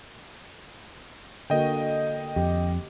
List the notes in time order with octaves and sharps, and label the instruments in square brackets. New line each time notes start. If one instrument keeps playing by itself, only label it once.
[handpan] D3 A#3 F#4 [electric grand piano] D#5 G5
[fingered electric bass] F2 [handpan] G4